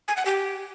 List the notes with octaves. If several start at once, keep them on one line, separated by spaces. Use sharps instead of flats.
G#5
F#5
G4